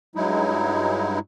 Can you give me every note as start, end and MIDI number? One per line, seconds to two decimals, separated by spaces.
0.16 1.19 43
0.16 1.19 54
0.16 1.19 56
0.16 1.19 63
0.16 1.19 64